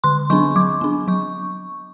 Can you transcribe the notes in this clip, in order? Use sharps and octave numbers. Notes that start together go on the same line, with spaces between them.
D3 C6
F#3 B3 D4 C#6
F#3 D6
B3 D4
F#3 C#6